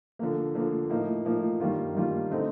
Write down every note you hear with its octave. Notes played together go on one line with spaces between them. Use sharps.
D3 F3 A#3
D3 F3 A#3
A2 F3 A#3 D#4
A2 F3 A#3 D#4
G2 D#3 G3 A#3 F4
G2 D#3 G3 A#3 F4
D3 A3 C4 D#4